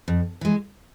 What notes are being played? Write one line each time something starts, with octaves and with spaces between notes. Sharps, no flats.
F2
E3 G#3